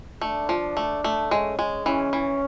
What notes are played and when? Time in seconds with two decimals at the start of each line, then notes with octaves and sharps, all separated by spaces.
0.21 A3 D4
0.49 F3
0.77 A3
1.04 A3
1.31 G#3 C#4
1.59 G#3
1.85 E3 C#4
2.13 E3